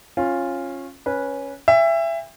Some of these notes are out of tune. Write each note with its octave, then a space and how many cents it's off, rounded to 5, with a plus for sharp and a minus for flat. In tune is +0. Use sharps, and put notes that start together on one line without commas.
C#4 -20 F4 +0
C#4 +0 B4 -15
E5 +20 G5 +45